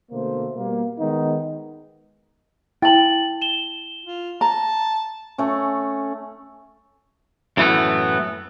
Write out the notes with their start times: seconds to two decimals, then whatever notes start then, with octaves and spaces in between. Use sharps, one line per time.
0.11 B2 D3 A3 A#3 C5
0.56 B2 G3 A#3
0.99 D#3 G#3 B3 D#4
2.82 E4 G5 A5 A6 F#7
3.42 E7 G7
4.05 F4
4.41 A5 A#5
5.38 A3 C#4
7.57 F#2 A2 E3 G#3 A3 B3